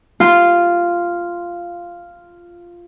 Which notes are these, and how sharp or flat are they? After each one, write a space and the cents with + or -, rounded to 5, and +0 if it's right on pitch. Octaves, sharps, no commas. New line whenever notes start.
F4 -5